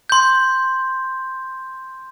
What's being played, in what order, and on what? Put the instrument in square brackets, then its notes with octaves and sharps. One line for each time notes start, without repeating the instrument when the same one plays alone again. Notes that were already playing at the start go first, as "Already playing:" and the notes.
[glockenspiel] C6 G6